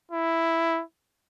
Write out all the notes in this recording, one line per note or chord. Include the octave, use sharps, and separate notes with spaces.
E4